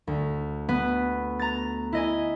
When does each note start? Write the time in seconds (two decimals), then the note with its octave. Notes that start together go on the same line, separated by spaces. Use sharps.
0.07 D2
0.69 B3
1.39 A#5 A6
1.93 E4 D#5 G#5